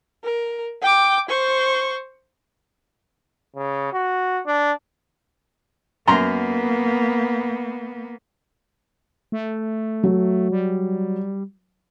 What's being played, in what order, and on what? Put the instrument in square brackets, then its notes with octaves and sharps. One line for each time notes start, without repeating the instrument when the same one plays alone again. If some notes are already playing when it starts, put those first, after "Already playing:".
[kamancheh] A#4
G5 D6
C5 C#6
[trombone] C#3
F#4
D4
[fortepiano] F#2 A#5 C6 [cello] A#3 B3
[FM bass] A3
[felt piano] F#3
[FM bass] G3